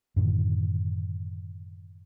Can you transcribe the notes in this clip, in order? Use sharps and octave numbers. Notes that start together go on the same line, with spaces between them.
F#2 A2 D3 D#3